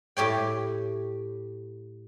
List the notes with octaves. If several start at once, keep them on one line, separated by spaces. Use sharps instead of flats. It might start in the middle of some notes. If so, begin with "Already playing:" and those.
A2 G4 C#5 G5